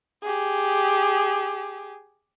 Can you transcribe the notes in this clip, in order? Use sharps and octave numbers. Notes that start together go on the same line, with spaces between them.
G4 G#4